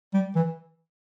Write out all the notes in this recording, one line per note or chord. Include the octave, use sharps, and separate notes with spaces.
G3
E3